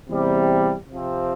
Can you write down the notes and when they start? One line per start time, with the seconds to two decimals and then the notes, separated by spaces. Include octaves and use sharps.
0.09 E2 C3 G3
0.89 C3 F3 C4